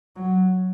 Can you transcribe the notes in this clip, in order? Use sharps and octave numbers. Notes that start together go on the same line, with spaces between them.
F#3